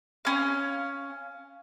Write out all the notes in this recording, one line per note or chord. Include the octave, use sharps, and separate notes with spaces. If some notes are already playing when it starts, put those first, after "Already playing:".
C#4 F5